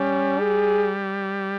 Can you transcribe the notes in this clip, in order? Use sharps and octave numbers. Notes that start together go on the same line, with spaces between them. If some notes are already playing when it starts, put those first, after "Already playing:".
Already playing: G3 C#4
G#4